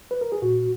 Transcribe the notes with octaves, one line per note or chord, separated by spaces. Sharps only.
B4
A#4
G#4
A#2 F#4